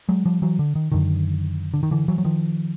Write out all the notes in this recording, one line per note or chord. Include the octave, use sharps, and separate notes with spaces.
F#3 G#3
F3 G3
E3 F#3
D3
D#3
F#2 D3 D#3
D3
D#3
D3 E3
E3 F#3
F#3
D#3 F3